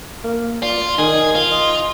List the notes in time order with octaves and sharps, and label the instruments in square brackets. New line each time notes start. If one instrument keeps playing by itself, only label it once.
[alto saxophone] A#3
[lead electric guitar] F4 [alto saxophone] D5
[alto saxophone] D#3 [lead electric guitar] G#4
[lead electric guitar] F4
[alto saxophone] D#5